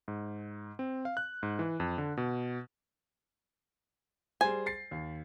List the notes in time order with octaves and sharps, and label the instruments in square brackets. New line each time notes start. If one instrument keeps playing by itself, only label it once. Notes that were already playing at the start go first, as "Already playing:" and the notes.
[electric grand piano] G#2
C4
F5
F#6
G#2
E3
F2
D3
B2
[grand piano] G3 G#4 C5 [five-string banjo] G#5
[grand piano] A6 C7
D#2